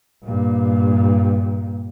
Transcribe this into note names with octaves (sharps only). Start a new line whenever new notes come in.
G2 A#2